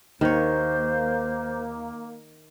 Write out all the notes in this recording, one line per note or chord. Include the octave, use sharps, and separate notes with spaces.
D#2 D#3 A#3 C5 C#5